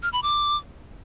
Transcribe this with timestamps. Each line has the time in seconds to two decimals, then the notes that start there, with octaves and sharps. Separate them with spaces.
0.03 F6
0.13 B5
0.23 D6